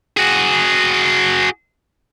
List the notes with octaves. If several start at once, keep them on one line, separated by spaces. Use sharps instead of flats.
F#4 G#4